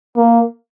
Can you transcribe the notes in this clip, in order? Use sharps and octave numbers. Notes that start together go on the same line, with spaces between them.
A#3